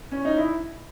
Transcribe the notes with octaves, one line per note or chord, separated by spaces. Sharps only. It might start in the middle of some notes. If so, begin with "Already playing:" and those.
C#4
D#4
E4